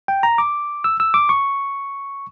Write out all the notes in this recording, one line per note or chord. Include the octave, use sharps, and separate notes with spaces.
G5
A#5
D6
E6
E6
D6
C#6